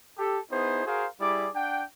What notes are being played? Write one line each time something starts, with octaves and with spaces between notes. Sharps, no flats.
G4 A4
B3 D#4 E4 G#4 C5
F#4 G#4 A#4 C5 F5
G3 E4 G#4 D5 D6
D4 F#5 G5